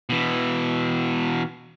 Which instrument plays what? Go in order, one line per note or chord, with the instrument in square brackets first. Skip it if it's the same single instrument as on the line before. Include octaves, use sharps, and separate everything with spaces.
[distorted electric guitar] B2 E3